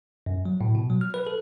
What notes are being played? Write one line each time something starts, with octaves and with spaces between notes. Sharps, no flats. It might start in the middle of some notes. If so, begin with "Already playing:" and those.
F#2
F#3
A2
B2
F#3
F6
B4
A4